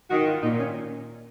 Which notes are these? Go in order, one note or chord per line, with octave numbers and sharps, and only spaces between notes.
D#3 F#4
F4
A#2 D#4
C#4